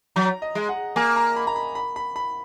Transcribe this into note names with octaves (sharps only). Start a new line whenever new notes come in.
F#3 A#5
D#5
G#3
F#5
A#3 G#5
A#5
B5
A#5
B5
B5
B5
B5